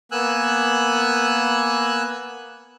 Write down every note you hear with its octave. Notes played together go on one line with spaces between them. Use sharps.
A#3 B3 G#5 E6 F#6